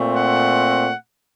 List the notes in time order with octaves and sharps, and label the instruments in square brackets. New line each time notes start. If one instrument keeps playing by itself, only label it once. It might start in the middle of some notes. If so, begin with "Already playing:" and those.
Already playing: [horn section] A#2 A3 C4
F#5